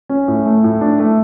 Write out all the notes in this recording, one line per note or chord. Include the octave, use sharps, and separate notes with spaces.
C#4
A2
A3
A2
D4
A3